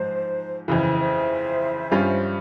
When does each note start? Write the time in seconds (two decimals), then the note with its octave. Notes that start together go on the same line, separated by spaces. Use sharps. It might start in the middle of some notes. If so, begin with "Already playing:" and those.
Already playing: G#2 F3 C5
0.68 F2 C#3 E3 C5 E5
0.98 C5 E5
1.91 G2 G3 C#4 F4